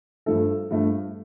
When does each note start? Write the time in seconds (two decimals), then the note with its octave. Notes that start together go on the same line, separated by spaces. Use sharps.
0.26 G2 F3 A3 A4
0.70 G2 F3 A3